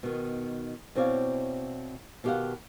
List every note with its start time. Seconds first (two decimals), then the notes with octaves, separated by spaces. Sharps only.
0.03 B2 D#3
0.95 B2 C4 E4 C#5 D5 F5
2.24 B2 D#3 G4 D#5 F5 F#5